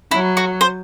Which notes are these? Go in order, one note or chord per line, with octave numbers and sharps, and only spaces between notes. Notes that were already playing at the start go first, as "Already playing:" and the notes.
F#3 E4
F#4
C5